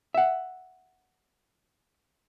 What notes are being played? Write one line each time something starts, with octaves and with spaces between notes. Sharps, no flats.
E5 F#5